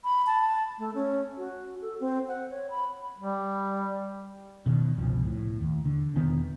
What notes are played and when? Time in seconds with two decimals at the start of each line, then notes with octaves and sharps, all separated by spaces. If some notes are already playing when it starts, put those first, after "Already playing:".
0.04 B5
0.27 A5
0.78 A3
0.95 C#4
1.37 F#4
1.82 A4
2.00 C4
2.28 F#5
2.50 C#5
2.70 B5
3.18 G3
4.66 B2 D#3
4.98 F#1 C2 B2 F3
5.26 A2
5.61 D#2
5.85 D3
6.16 E1 D#3 B3